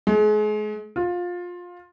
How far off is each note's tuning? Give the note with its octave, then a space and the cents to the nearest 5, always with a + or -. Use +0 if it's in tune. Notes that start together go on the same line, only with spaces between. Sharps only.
G#3 +35
F4 +20